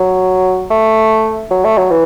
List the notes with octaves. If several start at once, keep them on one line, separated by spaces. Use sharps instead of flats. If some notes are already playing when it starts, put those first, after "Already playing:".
Already playing: F#3
A3
F#3
A3
F#3
E3